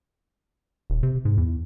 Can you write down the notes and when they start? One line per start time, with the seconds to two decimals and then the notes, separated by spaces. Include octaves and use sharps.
0.90 D#1
1.03 C3
1.25 G#2
1.38 E2